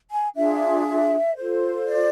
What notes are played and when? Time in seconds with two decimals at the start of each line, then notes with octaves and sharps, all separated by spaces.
0.10 G#5
0.35 D4 F4 G#4 E5
1.36 F4 A4 C5
1.86 D5